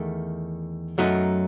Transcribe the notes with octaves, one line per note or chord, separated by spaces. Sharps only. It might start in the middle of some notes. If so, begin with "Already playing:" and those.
Already playing: E2 D#3 A3
F#2 F#3 A3 D#4